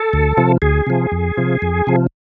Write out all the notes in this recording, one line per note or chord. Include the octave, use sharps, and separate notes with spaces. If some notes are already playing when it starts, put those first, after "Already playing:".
Already playing: A4
D2
C3 F3
D2 G#4
C3 F3
F2
C3 F3
F2
C3 F3